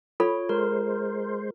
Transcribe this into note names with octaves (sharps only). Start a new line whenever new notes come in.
F4 A4 C#5 B5
G#3 A#4 C5